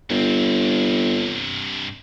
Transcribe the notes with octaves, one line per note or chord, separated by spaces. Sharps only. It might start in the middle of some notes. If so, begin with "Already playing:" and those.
G1 G2 C4